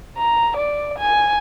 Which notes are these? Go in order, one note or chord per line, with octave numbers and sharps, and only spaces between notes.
A#5
D5
G#5